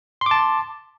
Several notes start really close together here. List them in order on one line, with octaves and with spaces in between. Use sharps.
C6 D6 A5